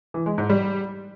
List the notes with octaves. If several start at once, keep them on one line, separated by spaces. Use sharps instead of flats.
E3
G#3
G#2
G3